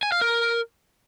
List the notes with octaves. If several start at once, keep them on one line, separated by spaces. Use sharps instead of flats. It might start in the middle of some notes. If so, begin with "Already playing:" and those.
G#5
F5
A#4